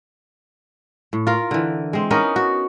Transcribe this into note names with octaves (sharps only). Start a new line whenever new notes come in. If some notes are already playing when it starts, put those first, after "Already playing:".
A2
F4 A#4
D3 E3
G#3 C4
B3 C#4 D#4 A#4
F#4